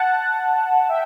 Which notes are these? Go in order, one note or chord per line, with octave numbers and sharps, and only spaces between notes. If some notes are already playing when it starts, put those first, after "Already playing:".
Already playing: F#5 A5
A5
E5 G5